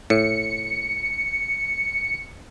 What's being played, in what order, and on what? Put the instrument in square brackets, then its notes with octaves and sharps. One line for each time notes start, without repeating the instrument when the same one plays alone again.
[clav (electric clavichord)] A2 [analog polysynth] C#7